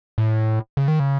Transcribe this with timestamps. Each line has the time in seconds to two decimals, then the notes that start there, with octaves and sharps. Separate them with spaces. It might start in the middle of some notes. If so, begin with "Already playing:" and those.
0.18 A2
0.77 C#3
0.88 D#3
1.00 C#3